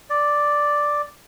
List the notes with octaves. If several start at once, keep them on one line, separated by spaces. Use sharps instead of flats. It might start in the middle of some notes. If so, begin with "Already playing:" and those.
D5